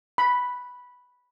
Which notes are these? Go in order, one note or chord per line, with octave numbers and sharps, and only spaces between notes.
B5